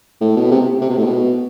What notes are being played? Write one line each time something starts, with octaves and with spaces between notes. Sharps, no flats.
A2
B2
C3
C3
B2
A2
B2